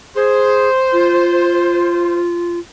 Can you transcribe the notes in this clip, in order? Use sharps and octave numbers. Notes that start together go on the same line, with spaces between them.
G#4 C5
F4